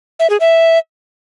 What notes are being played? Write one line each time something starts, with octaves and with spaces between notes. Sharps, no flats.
E5
G#4
E5